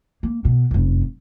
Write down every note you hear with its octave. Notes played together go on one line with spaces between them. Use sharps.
A#3
B2
F1 F#2